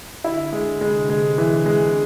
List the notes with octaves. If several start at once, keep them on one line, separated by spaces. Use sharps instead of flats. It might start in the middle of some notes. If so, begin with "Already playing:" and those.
D3 E4
G#3
C3 G#3
G#3
E3
G#3